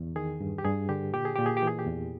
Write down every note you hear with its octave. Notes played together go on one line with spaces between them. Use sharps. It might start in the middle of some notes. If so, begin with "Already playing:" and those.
Already playing: E2
D#3 G#4
G2
G4
G2 G#4
D3 G4
A#2 G4
G#4
A#2 G4
G#4
G4
E3 G#4
G4
E2